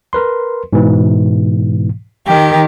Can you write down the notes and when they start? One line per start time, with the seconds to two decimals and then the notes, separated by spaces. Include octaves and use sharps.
0.13 A#4 B4 C6
0.73 G#2 B2 E3
2.27 D#3 G4